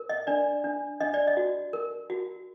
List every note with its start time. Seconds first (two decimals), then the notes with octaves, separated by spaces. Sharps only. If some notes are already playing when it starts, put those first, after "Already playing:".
Already playing: A#4
0.09 D#5
0.27 D4 D5
0.64 D4
1.00 D4 D#5
1.14 D5
1.27 D#5
1.37 F#4
1.73 A#4
2.10 F#4